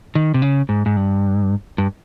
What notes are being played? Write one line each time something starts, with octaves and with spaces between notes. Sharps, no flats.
D#3
C3
C#3
G#2
G#2
G2
G2